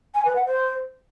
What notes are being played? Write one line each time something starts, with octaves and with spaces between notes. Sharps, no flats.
G#5
B4
F#5
C5